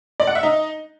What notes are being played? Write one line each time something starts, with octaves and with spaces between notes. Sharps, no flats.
D5
F#5
E5
D#4